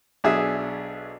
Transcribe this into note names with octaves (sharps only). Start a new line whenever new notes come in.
B1 D4 G#4 E5